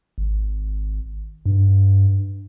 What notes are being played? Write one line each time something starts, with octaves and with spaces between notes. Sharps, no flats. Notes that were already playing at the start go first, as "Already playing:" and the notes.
G#1
G2